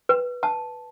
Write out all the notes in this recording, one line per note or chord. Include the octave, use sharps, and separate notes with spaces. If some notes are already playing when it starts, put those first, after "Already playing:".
B4
A5